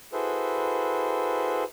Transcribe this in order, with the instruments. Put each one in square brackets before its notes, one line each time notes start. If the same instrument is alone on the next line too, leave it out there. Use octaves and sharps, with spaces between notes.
[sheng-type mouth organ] E4 F#4 G#4 A4 B4 C5